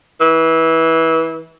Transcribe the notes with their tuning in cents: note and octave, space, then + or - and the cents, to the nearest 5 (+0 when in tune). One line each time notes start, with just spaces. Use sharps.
E3 -20